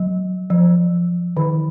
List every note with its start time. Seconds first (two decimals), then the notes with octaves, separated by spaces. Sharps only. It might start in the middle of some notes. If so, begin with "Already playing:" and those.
Already playing: F#3
0.50 F3
1.37 D#3